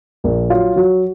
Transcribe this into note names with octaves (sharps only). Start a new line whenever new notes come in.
A#1 A#4
F#3 F4
F#3 F#4